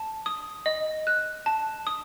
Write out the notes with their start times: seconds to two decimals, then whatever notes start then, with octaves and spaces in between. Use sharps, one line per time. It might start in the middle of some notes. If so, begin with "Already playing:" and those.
Already playing: A5
0.26 D#6
0.66 D#5
1.07 F#6
1.46 A5
1.87 D#6